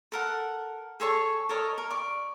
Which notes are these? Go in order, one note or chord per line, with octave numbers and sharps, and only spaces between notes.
A4 A#4 F#5
G#4 A4 C#5 C#6
A4 A#4 C#5 D#5
A#4
D5 C#6